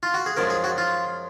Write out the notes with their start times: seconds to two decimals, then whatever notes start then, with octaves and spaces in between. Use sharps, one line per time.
0.03 F4
0.14 F#4
0.26 G#4
0.37 F#2 F3 G#3 A#4
0.50 G#4
0.64 F#4
0.78 F4